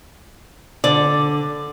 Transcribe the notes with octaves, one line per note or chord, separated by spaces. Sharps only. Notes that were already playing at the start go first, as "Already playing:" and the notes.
D3 D5